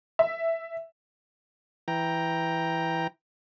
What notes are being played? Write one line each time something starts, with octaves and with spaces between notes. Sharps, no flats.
E5
E3 G5 A#5